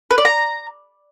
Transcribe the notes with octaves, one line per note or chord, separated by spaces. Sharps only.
B4
D5
A#5